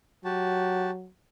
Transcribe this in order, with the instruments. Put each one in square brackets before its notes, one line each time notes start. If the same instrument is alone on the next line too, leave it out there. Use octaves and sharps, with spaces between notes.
[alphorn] F#3 [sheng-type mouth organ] F#4 G4 A5